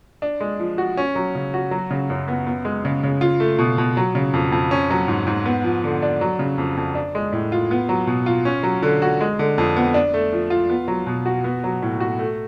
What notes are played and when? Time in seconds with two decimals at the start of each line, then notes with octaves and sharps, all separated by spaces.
0.22 D4
0.40 G#3
0.59 F3
0.78 F#4
0.97 C#4
1.15 F#3
1.35 C#3
1.54 F#4
1.71 F#3
1.91 C#3
2.10 F#2
2.28 B3
2.47 B3
2.65 G#3
2.85 C#3
3.03 C#3
3.21 F4
3.40 A3
3.58 B2
3.78 B2
3.97 F#3
4.15 C#3
4.33 F2
4.52 F2
4.71 C#4
4.90 F#3
5.08 G#2
5.27 G#2
5.45 B3
5.64 F3
5.84 D3
6.02 D4
6.21 F#3
6.39 C#3
6.58 F2
6.77 F2
6.95 D4
7.15 G#3
7.32 A2
7.52 F4
7.71 B3
7.89 F#3
8.07 B2
8.26 F4
8.45 C#4
8.63 F#3
8.82 D3
9.02 F#4
9.21 G#3
9.39 D3
9.58 F2
9.76 B3
9.94 D4
10.14 A3
10.33 F3
10.50 F4
10.70 B3
10.88 F#3
11.06 B2
11.26 F#4
11.44 B3
11.64 F#3
11.82 A2
12.00 F#4
12.19 A3